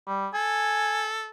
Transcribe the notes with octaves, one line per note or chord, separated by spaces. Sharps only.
G3
A4 G#5